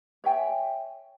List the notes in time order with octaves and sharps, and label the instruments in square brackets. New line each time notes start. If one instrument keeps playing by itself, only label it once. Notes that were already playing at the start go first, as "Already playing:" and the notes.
[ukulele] C#5 E5 G5 G#5